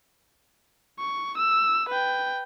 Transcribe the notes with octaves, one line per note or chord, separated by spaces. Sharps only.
C#6
E6
B4 G5